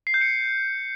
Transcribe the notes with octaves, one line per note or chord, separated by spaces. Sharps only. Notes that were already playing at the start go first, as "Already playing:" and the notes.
C7
G6
C#7